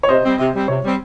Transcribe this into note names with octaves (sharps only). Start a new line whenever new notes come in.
C#5
C3 C5 D#5
G3 C4
C3
G3 C4
C3 C#5
G3 C4